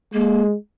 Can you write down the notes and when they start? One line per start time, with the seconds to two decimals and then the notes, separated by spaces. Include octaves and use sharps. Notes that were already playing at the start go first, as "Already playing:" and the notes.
0.14 G#3 A#3